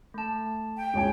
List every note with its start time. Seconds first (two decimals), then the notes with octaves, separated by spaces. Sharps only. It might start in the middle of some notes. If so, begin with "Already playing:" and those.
0.14 A3 A5
0.77 G5
0.94 C#2 C#5 G#5